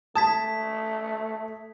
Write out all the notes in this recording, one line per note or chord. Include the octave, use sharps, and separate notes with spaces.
A3 A5 D#6 G#6 B6